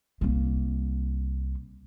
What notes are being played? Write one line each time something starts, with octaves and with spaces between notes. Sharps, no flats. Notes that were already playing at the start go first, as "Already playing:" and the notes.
C2 A#3